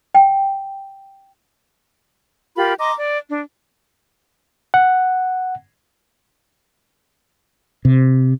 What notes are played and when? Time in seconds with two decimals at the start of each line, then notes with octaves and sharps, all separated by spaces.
0.15 G5
2.55 F4 G4 A#4 B5
2.78 D#5 A#5 C6 D6
2.97 D5
3.30 D4
4.74 F#5
7.85 C3